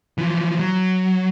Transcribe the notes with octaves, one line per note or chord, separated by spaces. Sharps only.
E3 F3
F#3